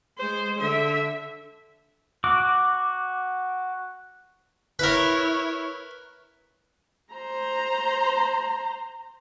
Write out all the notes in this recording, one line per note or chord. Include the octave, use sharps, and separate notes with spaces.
G#3 C5
D3 E5
F#4 D6
E4 A#4 B4 C#5
C5 A#5